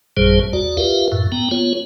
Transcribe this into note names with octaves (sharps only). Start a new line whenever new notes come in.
A1 F#2 A#2 G3 G#4 C5
D#2 F#4 D5
F4 G4 A#4 B4 E5 F5
F#2 A2
B3 G5 A#5
B3 F4 C#5